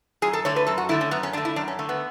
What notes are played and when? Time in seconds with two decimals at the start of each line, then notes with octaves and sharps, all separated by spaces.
0.22 F#2 G#4
0.33 A4
0.45 D3 A3 C#5
0.56 B4
0.67 F#2 A4
0.78 F#4
0.89 D3 A3 E4
1.01 C#4
1.11 F#2 B3
1.23 C#4
1.33 D3 A3 D4
1.45 E4
1.56 F#2 D4
1.68 C#4
1.79 D3 A3
1.89 B3